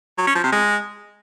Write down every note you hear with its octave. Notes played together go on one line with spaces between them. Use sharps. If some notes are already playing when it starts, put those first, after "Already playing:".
F#3
C#4
F3
C3
G#3